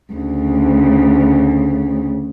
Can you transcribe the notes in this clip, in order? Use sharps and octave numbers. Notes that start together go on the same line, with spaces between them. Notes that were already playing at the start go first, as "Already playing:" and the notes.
D2 C#3